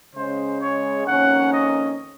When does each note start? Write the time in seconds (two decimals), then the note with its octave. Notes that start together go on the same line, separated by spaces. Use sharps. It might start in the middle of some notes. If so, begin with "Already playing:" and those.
0.15 C#3 G#3 C#4 C5
0.61 C#5
1.07 F2 D#3 A#3 C#4 F#5
1.53 D#5